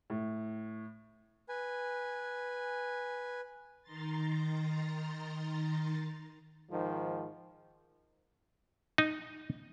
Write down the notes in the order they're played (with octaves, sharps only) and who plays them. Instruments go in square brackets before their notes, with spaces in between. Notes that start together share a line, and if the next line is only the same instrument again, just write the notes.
[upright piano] A2
[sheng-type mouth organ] B4 G#5
[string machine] D#3 A#5 C6 A6
[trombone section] G#2 D#3 F3
[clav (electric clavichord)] D#4